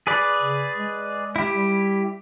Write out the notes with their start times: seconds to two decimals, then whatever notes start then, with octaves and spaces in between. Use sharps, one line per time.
0.07 G#4 B4 D5
0.40 C#3
0.76 G#3
1.36 E4 G4
1.55 G3